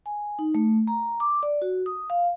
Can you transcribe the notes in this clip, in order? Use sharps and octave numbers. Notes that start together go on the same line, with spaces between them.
G#5
D#4
A3
A#5
D6
D5
F#4
D#6
F5